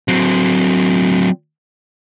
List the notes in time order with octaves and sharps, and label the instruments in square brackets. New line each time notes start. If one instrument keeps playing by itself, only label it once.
[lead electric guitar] F#3 C4